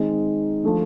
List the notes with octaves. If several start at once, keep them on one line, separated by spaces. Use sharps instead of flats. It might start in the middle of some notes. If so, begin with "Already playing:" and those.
Already playing: D#3 G#3 C4 D#4
F3 A3 D4